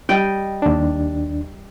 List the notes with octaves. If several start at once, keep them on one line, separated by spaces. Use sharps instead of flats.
G3 D#5 G5
D#2 D4